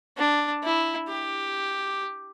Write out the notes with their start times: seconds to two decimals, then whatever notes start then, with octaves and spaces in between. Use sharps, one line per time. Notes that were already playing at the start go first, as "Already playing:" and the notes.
0.18 D4
0.64 E4
1.09 G4